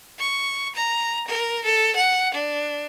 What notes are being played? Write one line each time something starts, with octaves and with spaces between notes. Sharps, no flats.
C#6
A#5
A#4
A4
F#5
D4